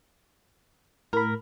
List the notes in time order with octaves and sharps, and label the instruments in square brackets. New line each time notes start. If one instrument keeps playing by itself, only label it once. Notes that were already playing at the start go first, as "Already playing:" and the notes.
[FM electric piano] A2 B5 [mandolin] A#4